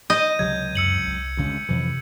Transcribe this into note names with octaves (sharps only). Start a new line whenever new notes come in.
D#5 G6 D#7
C#2 C3 F#3 G#6
F#2 E6 C#7 F#7
C2
D2 C#3 G#3
F2 C3 E3